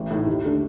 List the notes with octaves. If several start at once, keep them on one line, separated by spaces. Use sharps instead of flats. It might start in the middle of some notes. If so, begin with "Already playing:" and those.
Already playing: A1
A2 A3 D#4
D#2
D3 A3 D4